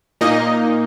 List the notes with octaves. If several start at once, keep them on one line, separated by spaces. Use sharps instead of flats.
A#2 A#3 D#4 D#5